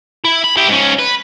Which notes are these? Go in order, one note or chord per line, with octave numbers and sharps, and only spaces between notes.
E4
B5
E4 G4
G#2 C#4
B4